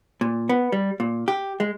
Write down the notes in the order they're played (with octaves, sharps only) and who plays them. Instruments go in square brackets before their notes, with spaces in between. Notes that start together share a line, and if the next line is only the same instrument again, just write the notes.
[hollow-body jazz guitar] A#2
B3
G3
A#2
G4
G#3